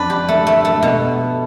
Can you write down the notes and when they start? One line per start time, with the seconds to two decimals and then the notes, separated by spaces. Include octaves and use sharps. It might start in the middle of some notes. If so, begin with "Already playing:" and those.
Already playing: F2 D4 B4
0.10 G4
0.28 A3
0.47 A3
0.65 A3
0.82 B2